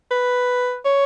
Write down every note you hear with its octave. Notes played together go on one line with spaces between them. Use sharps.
B4
C#5